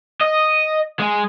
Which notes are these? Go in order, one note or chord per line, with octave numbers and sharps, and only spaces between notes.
D#5
G#3